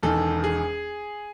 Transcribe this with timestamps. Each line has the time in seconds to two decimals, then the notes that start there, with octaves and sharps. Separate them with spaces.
0.03 E1 E2 D#3 A4
0.44 G#4